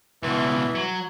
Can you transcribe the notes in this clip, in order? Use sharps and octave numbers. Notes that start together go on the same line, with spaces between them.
C#2 B2 E3
F#3